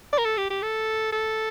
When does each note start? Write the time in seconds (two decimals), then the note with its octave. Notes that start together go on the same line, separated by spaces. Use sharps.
0.13 D5
0.18 A#4
0.25 A4
0.38 G4
0.50 G4
0.62 A4
1.13 A4